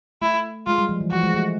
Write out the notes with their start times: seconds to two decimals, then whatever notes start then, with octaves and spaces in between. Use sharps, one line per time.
0.22 A3 E4
0.66 G#3 F4
0.78 G3
0.89 F3
1.01 E3
1.12 F3 F#4
1.23 G#3
1.34 A3